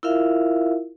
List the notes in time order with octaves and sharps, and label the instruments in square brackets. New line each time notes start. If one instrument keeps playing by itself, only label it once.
[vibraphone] E4 F4 A#4 E5 F5